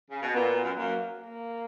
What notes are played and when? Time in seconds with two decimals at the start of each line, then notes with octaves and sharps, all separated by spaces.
0.11 C#3
0.22 B2
0.34 A#2 B3
0.63 F#2
0.77 F#2 A#3
1.21 A#3